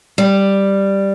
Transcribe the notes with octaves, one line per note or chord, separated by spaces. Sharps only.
G3